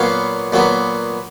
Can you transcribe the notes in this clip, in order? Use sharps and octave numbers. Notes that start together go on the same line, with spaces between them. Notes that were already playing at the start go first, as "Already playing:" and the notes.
Already playing: A#2 F#3 B3 C#5 F5
A#2 F#3 B3